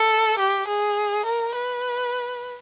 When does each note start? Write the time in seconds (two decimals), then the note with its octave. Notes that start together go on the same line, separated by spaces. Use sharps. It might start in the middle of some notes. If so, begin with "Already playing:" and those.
Already playing: A4
0.39 G4
0.68 G#4
1.26 A#4
1.55 B4